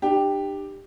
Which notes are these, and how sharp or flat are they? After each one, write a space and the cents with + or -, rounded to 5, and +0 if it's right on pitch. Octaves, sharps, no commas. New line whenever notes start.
D4 +40 G4 +5